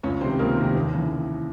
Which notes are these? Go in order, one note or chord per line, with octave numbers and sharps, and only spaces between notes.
C#2 C#4 C#5
C3 D#3 C4 C5
C#2 A#3 A#4
C3 D#3
D#2
C#3 E3